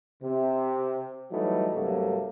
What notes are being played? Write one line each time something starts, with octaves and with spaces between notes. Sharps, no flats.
C3
E3 F#3 G3 A3 D#4
G2 C3 F#3 A3 A#3